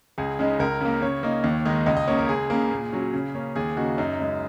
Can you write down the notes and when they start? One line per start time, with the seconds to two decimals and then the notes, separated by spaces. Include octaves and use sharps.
0.18 C#2 G#4
0.39 C#3 G#3 D#4
0.59 C#2 A#4
0.81 C#3 A#3
1.01 C#3 C#5
1.23 A#3 D#4
1.44 D#2
1.65 D#3 G#3 D#4
1.86 C#2 D#5
1.97 D#5
2.07 C#3 A#3 C#5
2.18 A#4
2.29 C#2 G#4
2.50 C#3 A#3
2.71 A#2
2.92 F#3 C#4
3.14 C#3
3.35 A#3 C#4
3.56 D#2 G#4
3.77 C#3 A#3 D#4 F#4
3.98 F#2 D#4
4.19 C#3 G#3 D#4